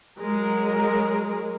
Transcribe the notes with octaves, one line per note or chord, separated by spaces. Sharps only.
F#3 G#3 A#4